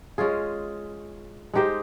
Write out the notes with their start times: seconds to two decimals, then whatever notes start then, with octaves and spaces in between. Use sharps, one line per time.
0.18 G#3 C#4 F4 G#4
1.54 G#3 D#4 G4 C5